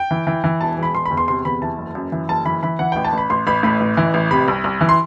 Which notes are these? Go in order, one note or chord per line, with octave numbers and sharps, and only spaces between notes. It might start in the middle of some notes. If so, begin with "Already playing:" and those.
Already playing: G5
E3
E3
E3
E1 A5
E1 B5
E1 C6
B5
E2
C6
C3 C6
E2 B5
E3 A5
F#1
F#2
E3
F#1 A5
E3 B5
E3 B5
E3 F#5
A1 G5
A5
A1 B5
A1 C6
A1 B5
A2 B5
A1
E3
A1
C3 B5
C2
C2
E3
C6